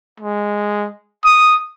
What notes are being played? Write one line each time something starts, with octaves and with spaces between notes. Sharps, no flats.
G#3
D#6